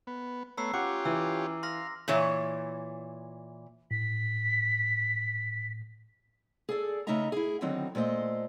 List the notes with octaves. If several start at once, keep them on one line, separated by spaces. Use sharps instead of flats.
B3
A3 B3 C#5 A#5 E6 C7
C#4 F4 G4 F#5 D6
E3 E6
F5 C6 F6 A#6
A#2 E3 C#5
A2 B6
G#4 A4 D5
C#3 A3 D#4 D#5 E5 A#5
E4 G#4
D3 D#3 F#3 C4 D#4
A#2 A3 C5 D#5